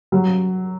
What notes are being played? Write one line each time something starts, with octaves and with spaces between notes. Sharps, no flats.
F#3